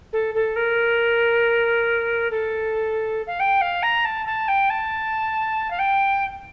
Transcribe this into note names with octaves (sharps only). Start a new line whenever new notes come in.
A4
A4
A#4
A4
F5
G5
F5
A#5
A5
A5
G5
A5
F5
G5